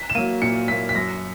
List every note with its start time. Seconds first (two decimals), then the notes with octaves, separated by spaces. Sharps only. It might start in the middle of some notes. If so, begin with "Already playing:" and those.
Already playing: B6
0.10 E7
0.15 F#3 A#3 D#7
0.42 A#2 C#7
0.68 F#3 A#3 B6
0.89 B6
0.95 F#2 A#6